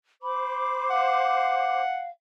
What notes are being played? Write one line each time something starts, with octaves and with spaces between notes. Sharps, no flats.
C5 B5 D6
F5 F#5